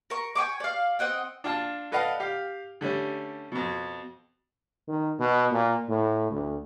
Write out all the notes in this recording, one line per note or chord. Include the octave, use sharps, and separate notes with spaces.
A#4 C#6
G5 G#5 C#6 D6
D5 F5
C4 D#5 F#5 G5
D4 F4 A5
A4 B4 D5 D#5 F5 F#5
G4 F5
D3 G3 A3 C#4
F2 B2
D#3
B2
A#2
A2
D2